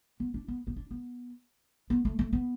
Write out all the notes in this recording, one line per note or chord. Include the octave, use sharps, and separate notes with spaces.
B3
D4
B3
B3
D4
B3
B3
A3
A3
B3